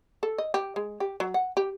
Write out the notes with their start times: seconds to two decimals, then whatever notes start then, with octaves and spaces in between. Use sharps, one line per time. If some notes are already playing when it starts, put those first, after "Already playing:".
0.23 A4
0.38 D#5
0.54 G4
0.76 G#3
1.00 G4
1.20 F#3
1.34 F#5
1.57 G4